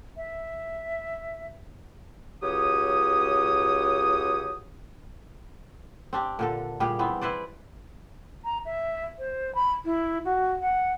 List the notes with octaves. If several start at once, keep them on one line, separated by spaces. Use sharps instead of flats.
E5
C#2 F#3 G4 C#5 D#6
C4 D4 G4
A#2 D3 A4
A#2 G3 G4 G#4
E3 B3 C4
E4 B4 C5 D5
A#5
E5
C5
B5
E4
F#4
F#5